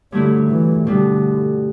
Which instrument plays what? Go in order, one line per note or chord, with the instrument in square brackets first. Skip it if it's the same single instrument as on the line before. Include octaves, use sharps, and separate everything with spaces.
[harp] G2 F#3 A3 E4 [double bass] D3
[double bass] E3
[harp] B2 G3 D4 [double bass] D3